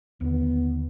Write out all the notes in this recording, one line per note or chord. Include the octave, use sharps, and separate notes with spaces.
D#2 D3 B3